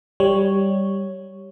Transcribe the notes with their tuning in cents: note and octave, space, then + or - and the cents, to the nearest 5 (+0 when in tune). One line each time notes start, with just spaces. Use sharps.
G3 +0 C#5 +0